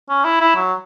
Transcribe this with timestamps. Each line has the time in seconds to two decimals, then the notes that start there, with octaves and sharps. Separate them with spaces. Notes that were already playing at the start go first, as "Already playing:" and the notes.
0.09 C#4
0.25 E4
0.41 E4
0.56 F#3